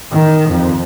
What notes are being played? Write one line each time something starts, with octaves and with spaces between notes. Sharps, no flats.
D#3
F2